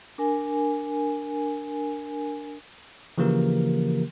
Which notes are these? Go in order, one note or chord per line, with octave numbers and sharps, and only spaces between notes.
D4 A#4 G#5
C#3 E3 F3 A#3 G4 A#4